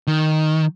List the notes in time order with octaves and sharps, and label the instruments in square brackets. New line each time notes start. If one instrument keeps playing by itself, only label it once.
[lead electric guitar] D#3